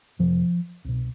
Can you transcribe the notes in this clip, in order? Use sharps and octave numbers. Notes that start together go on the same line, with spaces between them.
F2 C3 F3
C2 B2